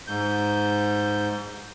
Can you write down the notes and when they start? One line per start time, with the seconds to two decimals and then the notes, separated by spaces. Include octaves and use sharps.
0.07 G#2 G6